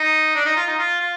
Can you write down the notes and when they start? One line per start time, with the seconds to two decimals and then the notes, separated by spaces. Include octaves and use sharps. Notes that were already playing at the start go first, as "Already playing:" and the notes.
Already playing: D#4
0.35 D4
0.45 D#4
0.56 F4
0.67 D#4
0.79 F4
1.00 F4